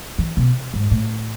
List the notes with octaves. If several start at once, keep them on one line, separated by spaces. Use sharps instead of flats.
E3
B2
G#2
A2